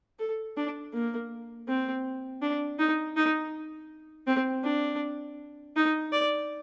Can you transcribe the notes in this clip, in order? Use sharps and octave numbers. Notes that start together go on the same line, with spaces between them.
A4
D4
A#3
C4
D4
D#4
D#4
C4
D4
D#4
D5